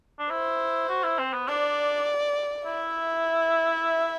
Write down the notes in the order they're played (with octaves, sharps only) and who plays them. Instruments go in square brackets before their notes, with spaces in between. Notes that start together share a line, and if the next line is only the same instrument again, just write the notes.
[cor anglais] D4
[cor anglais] E4 [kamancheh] C5
[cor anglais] F#4
E4
C4
B3
[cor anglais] D4 [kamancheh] D5
[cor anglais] E4 [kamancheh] E5